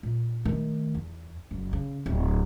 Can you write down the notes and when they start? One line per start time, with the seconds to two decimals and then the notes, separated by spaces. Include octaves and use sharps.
0.03 A#2
0.45 D#3 A3
0.94 E2
1.51 F#1
1.73 C#3
2.06 D1